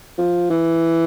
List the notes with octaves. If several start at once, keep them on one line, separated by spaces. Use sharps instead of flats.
F3
E3